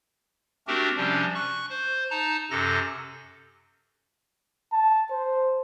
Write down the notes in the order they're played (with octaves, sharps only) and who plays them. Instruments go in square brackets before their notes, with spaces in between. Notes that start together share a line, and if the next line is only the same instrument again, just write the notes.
[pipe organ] A3 C4 D4 F#4 G4 A#4
C3 F3 G3 C#4 D4
C#6 F#6
C5
D#4 A5 A#5
F#2 C3 A4 A#6
[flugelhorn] A5
C5